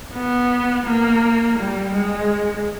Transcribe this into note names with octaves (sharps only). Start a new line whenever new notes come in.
B3
A#3
G3
G#3